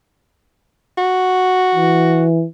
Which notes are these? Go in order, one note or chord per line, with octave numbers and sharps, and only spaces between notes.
F#4
E3